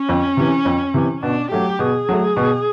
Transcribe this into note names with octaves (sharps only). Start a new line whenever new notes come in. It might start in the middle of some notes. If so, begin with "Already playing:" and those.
Already playing: C#4
F2
C3 E3
F2
C3 E3
B2 D4
F#3 A3 G4
B2 G#4
F#3 A3
B2